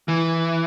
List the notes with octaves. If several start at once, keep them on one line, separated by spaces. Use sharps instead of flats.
E3